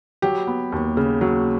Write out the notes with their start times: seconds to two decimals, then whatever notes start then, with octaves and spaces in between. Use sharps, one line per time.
0.22 F#3 G4
0.47 B3
0.72 D#2
0.97 C#3
1.21 F#3